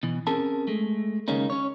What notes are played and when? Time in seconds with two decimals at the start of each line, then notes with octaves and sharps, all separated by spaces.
0.03 B2 E3
0.27 C4 C#4 G#4 A#4 A5
0.67 G#3 A3
1.28 D#2 C#3 G#3 A#3 C#4 D#4
1.50 C#4 C#5